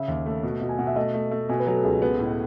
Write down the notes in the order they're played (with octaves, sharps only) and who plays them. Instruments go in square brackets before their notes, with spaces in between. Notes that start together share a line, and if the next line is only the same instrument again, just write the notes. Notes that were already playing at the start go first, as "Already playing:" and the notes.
Already playing: [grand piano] C#3 [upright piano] E5
[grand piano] D#2
A3
B2
B2
[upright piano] G#5
[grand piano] B2 [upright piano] F#5
[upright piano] E5
[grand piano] A3 [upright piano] D#5
[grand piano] A3
A3
[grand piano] B2 [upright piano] G#5
[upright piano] B4
[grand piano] F#3 [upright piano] A4
[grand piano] C#2 [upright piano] G#4
[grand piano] B3
A2